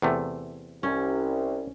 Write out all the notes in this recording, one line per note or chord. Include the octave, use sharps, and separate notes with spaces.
E2 C3 A3
C2 C#4